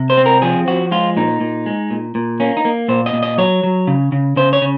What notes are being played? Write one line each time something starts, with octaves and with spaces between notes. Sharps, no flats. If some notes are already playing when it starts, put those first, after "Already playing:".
Already playing: C3
C5
C4
A#4
F3 G#4
F3 F#4
G#3 F4
A#2 D#4
A#2
G#3
A#2
A#2
A#3 C#4
D#4
A#3
A#2 C5
D#5
A#2
D#5
F#3 C#5
F#3
C#3
C#3
C#3 C5
C#5
C#3